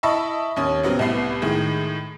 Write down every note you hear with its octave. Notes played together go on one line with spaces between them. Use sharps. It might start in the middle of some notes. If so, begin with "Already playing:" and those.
E4 D#5 E5 A5 B5 C#6
D#2 C#4 D#6
C#3 F#3 B3 C4
C2 A2 B3 C7
A2 D#3 G#3 G#4